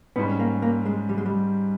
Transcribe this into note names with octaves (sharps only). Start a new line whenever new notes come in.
G#2 G3 B3 C#4
A#3
A#3
G#3
G3
G#3
G3